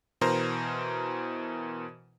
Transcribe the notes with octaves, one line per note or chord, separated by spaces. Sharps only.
B2 E3 A#4 C5 A#5